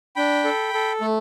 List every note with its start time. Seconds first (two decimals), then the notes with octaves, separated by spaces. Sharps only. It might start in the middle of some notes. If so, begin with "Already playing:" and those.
0.16 D4 G5 B5
0.44 A4
0.74 A4
1.01 A3